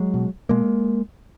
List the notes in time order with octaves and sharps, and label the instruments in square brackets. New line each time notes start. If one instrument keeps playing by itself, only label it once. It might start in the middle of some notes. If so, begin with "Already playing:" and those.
Already playing: [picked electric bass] F#3 G#3
B2
B2 G#3 A#3